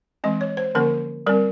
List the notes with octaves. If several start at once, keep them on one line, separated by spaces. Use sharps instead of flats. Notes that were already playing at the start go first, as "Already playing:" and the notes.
E3 G#3 C4 D#5
C#5
C5
D3 F3 A#3 C#4 A#4
G3 C4 A#4